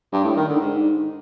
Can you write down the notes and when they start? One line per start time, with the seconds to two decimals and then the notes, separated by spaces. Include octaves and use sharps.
0.12 G2
0.24 A2
0.36 D#3
0.48 D3
0.60 G#2